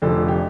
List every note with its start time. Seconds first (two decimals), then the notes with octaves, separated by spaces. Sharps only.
0.02 F1 F2 D3 F3 A4
0.28 G4